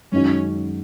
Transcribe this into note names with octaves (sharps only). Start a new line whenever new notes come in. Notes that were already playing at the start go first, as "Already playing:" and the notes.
F#2 D#3 G#3 C#4 D#4 F#4